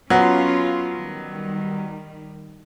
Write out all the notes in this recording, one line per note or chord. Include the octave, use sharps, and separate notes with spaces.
F#3 B3 C#4 F4
D#3 G3